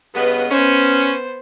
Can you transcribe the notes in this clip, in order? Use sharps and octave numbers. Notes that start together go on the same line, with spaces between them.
G2 C#3 B3 B4 D#5
B3 C#4 C5